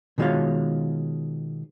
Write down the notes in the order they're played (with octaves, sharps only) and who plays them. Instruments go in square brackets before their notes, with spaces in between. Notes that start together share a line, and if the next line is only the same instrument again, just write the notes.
[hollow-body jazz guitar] B2 D#3 G#3 F4 C#5 F5